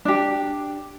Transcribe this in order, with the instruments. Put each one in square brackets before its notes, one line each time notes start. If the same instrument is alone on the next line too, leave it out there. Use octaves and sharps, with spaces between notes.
[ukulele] D4 G4